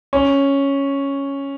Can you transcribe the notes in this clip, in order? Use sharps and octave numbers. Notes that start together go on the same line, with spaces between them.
C#4